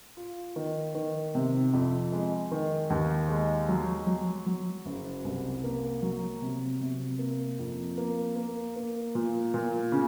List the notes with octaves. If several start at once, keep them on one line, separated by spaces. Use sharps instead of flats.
F4
D#3
D#3
C3
F2
G#3
D#3
D#2
G#3
F#3
F#3
F#3
F#1
C2
A#3
F#3
C3
C3
A#3
F2
A#3
A#3
A#3
A#2
A#2
C#3